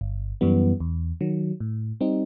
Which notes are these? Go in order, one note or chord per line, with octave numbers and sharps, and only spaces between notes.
G1
F#2 E3 G3 B3
E2
D#3 F#3
A2
G3 C4 D#4